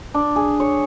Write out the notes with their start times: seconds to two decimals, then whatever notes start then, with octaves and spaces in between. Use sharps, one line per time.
0.14 D4
0.36 G#4
0.60 C#5